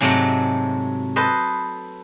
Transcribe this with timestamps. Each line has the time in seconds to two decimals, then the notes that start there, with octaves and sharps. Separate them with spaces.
0.01 G#2 C3 F#3 G#3 A3
1.16 A4 B4 C5 D#5